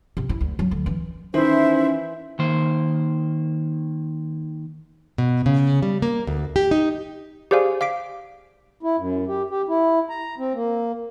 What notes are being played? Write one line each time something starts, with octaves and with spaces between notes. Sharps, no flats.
C3
E4
D2
F#3
D2
E3
D#3 E3 C#4 E4 C5
D#3 A#3 C5
B2
C#3
G3
A#3
D2
G4
D#4
G4 G#4 C5 D5 F5 G#5
F5 D6 B6 D7
E4
F#2
G4
G4
E4
A#5
C4
A#3